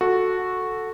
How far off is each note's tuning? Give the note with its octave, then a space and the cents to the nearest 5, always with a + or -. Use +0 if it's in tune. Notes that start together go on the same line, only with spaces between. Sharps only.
F#4 -10 A4 +0